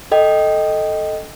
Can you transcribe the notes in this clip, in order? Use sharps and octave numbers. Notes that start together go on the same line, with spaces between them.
A4 D#5 G5